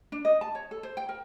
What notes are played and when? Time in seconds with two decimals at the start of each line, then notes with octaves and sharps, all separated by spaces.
0.12 D4
0.25 D#5
0.41 A5
0.55 C#5
0.71 A4
0.83 C5
0.97 G5
1.09 A#4